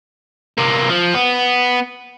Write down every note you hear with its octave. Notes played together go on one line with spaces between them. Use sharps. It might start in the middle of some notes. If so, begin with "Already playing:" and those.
C3 A#3
F3
B3